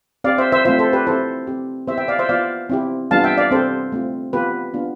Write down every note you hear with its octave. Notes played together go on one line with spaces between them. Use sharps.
C4 G4 D5 F5
C5 E5
C5 E5
A3 C4 F4 C5 E5
A4 C5
G4 B4
C4 E4 G4 A4 C5
C4 G4
B3 E4 G4 C5 E5
E5 G5
D5 F5
C5 E5
B3 F4 D5 F5
C4 E4 G4
G3 B3 D4 F4 F5 A5
E5 G5
D5 F5
C4 G4 A4 C5
A3 C4 F4
B3 F4 G4 B4
B3 D4 F4